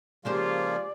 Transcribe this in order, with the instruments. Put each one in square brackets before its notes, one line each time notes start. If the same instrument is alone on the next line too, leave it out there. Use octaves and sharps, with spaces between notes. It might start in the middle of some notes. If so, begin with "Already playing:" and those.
[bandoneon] C#3 F3 A#3 [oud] G#3 G4 C5 [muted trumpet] F4 [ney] D5